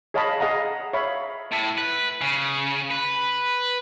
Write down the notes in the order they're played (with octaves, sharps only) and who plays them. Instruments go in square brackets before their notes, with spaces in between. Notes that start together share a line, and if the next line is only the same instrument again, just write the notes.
[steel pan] G#4 C#5 D#5 F5 A5 B5
G#4 D#5 F5 F#5 A#5
C#5 E5 F5 B5
[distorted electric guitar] A2
B4
C#3
B4